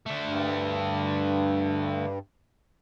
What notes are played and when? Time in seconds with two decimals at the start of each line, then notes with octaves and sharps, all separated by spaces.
0.06 D3 A3
0.25 G2